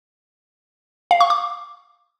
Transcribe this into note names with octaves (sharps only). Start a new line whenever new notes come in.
F5
C#6
D6